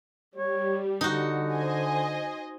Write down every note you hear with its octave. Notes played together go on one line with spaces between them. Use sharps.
G3 C#5
D3 D#4 F#4
C5 D#5 G#5